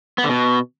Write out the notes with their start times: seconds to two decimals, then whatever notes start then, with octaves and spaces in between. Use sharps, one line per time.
0.18 B3
0.24 D3
0.29 B2